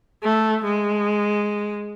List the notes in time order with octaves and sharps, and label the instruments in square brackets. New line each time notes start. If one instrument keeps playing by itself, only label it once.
[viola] A3
G#3